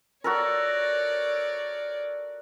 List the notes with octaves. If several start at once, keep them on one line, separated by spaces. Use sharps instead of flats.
F#4 A4 A#4 C#5 D5